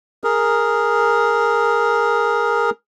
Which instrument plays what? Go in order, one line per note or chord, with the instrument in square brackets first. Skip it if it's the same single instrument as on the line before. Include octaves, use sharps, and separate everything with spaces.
[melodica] G#4 A#4